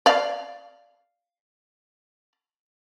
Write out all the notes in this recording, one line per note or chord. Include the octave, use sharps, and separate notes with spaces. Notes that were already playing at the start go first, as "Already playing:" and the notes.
D5 F5